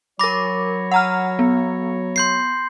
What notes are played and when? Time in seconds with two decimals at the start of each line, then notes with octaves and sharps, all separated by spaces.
0.19 F#3 A#4 C#5 B5 D6 A#6
0.91 F#5 A#5 F6
1.39 B3
2.16 C6 G6 C7